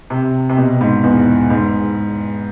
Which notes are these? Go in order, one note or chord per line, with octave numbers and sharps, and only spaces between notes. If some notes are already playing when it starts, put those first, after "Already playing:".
C3
C3
B2
G#2
E2
G#2